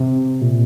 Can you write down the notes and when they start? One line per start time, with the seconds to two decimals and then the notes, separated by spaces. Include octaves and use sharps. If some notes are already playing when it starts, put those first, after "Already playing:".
Already playing: C3
0.41 A#2